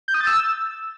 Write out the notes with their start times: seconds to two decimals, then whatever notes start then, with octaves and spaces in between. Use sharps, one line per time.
0.08 G6
0.14 D#6
0.21 A6
0.27 E6